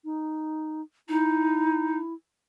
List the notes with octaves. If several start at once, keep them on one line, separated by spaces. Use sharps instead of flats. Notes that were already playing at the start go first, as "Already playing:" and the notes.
D#4
D#4 E4